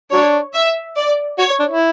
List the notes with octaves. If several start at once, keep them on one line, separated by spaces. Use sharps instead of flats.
F#3 D4 C#5
E5
D5
F#4 C#5
D4
E4